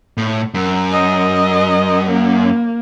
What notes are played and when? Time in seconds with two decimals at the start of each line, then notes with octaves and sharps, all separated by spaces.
0.17 A2
0.54 F#2
0.92 D#5
2.09 A#3